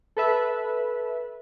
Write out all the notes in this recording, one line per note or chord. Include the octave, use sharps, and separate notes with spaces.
A4 B4 E5